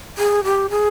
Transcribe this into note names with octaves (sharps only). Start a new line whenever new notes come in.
G#4
G4
G#4